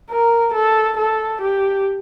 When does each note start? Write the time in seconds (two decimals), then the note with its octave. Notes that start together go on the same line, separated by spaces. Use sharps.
0.10 A#4
0.54 A4
0.98 A4
1.42 G4